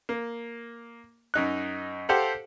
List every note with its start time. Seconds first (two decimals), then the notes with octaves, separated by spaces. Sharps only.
0.09 A#3
1.34 F#2 D#4 F#6
2.09 G4 A4 C5 F5 F#5